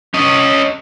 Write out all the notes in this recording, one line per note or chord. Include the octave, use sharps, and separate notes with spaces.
C#4 D#5